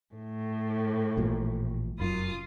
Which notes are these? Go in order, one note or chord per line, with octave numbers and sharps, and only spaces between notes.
A2
A1 A#2 F3
F1 F#2 F4 D#6